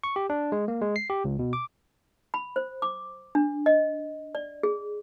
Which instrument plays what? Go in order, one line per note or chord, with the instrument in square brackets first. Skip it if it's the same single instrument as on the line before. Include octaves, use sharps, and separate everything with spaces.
[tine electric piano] C#6
G4
D4
G#3
A#3
G#3
C7
G4
C#2
B2
D6
[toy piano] B5
C5
D6
D4
D#5
D5
G#4